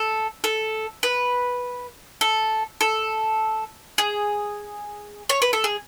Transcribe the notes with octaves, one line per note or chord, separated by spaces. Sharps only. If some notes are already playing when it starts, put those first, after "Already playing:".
Already playing: A4
A4
B4
A4
A4
G#4
C#5
B4
A4
G#4